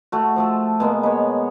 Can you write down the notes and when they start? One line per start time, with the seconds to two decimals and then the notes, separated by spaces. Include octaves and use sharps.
0.12 A3 F#4
0.36 F3 A3 A4
0.80 B2 G#3 A#3 B3
1.03 B4 C#5